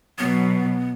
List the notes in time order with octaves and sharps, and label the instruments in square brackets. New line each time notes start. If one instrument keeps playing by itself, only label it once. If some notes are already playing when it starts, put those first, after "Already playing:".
[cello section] B2 F#3 [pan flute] B3